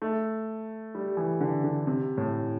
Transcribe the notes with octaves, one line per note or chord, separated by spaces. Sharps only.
A3
G3
E3
D3
D3
C3
A2